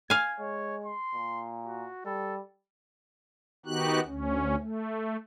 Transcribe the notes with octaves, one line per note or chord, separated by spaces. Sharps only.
F5 G#5 G#6
G#3 C#5
C6
A#2
F#4
G3 A4
D#3 B3 D#4 F#4 G4 F#6
D2 C#4
A3